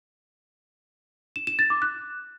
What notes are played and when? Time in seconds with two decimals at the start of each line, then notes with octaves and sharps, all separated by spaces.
1.36 E7
1.47 E7
1.59 A6
1.70 D6
1.82 F#6